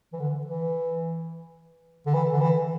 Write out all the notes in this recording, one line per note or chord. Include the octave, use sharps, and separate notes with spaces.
E3
D3
E3
D3
E3
D3
E3